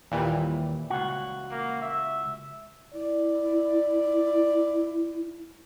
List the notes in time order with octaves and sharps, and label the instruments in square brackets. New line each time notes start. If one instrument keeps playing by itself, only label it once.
[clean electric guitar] D#2 [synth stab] A#2 E3 G3
[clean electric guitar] C#2 F#4
[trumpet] A#3
E5
[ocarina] E4 [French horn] D5